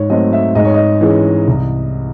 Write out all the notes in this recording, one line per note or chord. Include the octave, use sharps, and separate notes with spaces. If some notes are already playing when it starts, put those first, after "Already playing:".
Already playing: G#2 C#5
F#3 A3 C4 D#5
E5
G#2 D#5
C#5
D#5
E3 G#3 C#4
C2